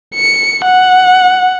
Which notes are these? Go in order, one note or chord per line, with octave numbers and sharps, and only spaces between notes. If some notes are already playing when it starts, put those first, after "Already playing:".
C#7
F#5